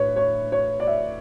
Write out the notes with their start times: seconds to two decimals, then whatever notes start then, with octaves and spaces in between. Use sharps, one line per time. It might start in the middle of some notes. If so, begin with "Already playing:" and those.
Already playing: A2 D4 B4 C#5
0.16 C#5
0.52 C#5
0.80 D5
0.87 E5